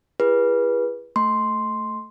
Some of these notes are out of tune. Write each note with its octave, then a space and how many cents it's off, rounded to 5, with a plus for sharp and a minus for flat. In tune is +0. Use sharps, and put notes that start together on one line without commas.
E4 +40 G#4 -30 B4 -25
A3 +0 C6 +0